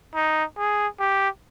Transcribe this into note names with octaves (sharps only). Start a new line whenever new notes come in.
D#4
G#4
G4